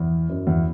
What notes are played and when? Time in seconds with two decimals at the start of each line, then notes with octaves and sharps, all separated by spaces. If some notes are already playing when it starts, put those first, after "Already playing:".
Already playing: E2
0.29 F#2
0.47 E2